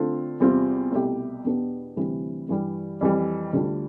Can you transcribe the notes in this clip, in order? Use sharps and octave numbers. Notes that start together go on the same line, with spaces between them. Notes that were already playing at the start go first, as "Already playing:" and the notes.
Already playing: D3 A3 C4 F4
E2 C3 G3 C4 F4
C2 B2 A3 E4 G4
E2 B2 B3 D4 G4
D2 C3 E3 G3
G2 E3 G3
F2 E3 G3
D2 D3 G3 D4 F4